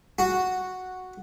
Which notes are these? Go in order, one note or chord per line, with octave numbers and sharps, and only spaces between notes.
F#4